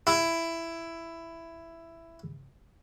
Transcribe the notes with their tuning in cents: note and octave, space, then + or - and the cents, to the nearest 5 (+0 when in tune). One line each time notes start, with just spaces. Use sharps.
E4 +10